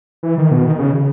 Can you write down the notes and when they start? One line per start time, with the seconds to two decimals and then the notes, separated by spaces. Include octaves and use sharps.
0.23 E3
0.38 D#3
0.51 B2
0.65 D#3
0.79 C#3